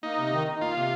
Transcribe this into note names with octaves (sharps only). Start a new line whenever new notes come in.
A#3 D#4
C3
D#3
D#4
A#3 F4
C3